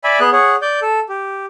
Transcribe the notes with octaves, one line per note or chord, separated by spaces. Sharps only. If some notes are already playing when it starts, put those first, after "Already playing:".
D5 E5 G#5 B5
B3 G#4 F#6
G#4 C#5 F#5
D5 G6
A4
G4